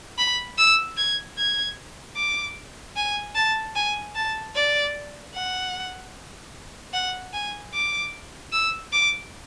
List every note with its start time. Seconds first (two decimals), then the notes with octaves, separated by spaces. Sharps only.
0.18 B5
0.58 E6
0.98 G#6
1.38 G#6
2.17 D6
2.97 G#5
3.36 A5
3.76 G#5
4.15 A5
4.55 D5
5.35 F#5
6.94 F#5
7.33 G#5
7.74 D6
8.53 E6
8.93 D6